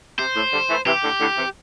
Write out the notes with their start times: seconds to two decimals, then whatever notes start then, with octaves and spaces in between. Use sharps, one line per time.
0.19 C3 C5
0.36 A2
0.53 D3 G3
0.70 E3 A3
0.86 C3 E3 G4
1.03 A2 D3
1.20 A2 D3
1.37 C3 E3